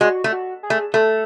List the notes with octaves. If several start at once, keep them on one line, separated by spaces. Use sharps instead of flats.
G#3 F#4
A3
F#4
G#4
A3
A3 A4